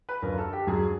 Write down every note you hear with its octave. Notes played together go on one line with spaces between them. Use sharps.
B4
F#2 D3 F3 A#4
A4
G4
F#2 D3 F#3 G#4